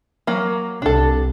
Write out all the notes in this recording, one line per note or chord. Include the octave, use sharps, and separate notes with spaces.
F#3 A#3
C2 D4 A4